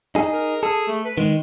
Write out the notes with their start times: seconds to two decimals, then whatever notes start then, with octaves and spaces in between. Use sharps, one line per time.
0.15 D#4 G#4
0.33 A#4
0.63 G#4 A4
0.88 A3
1.05 B4
1.18 D#3 G#3